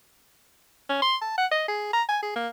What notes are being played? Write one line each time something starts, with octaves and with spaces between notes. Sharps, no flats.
C#4
C6
A5
F#5
D#5
G#4
A#5
G#5
G#4
A#3